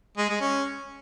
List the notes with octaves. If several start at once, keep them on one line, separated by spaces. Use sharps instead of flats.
G#3
G#3
C#4